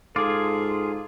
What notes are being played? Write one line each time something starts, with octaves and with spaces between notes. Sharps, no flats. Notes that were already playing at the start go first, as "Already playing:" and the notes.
G#2 F4 G#4 A4 D6